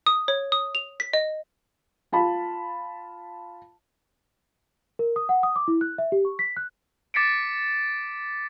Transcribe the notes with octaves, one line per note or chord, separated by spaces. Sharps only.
D#6
C#5
D#6
F7
B6
D#5
F4 A5 B5
A#4
D#6
F#5
D#6
D6
E4
F#6
E5
G4
C#6
B6
F#6
D6 A6 B6 C#7 D7